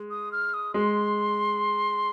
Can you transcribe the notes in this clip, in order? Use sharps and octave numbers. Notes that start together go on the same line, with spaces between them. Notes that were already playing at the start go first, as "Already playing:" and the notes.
Already playing: G#3
D#6
F6
D#6
G#3 C6